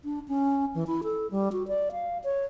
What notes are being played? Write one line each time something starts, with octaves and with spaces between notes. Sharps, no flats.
D4
C#4
E3
E4
A4
G3
F#4
D5
F5
C#5